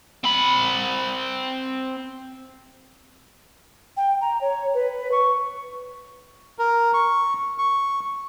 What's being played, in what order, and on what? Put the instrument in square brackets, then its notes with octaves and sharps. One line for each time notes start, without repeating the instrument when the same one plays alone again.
[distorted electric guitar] C4 B5
[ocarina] G5
A#5
C#5
B4
C#6
[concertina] A#4
C#6
C#6